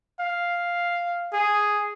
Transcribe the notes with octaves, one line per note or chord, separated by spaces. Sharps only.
F5
G#4